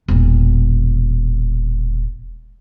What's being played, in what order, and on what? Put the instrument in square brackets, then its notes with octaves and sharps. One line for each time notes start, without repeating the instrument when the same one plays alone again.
[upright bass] E1 A#2